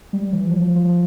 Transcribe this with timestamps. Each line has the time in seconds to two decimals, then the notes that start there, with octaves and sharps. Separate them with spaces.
0.13 G3
0.33 E3
0.47 F3
0.62 F3
0.76 F3